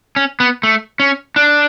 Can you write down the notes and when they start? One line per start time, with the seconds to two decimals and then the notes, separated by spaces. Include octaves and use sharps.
0.16 C#4
0.40 B3
0.63 A3
1.00 C#4
1.36 D4